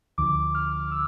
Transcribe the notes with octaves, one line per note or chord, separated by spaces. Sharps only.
D2 D3 F3 D6
F6
E6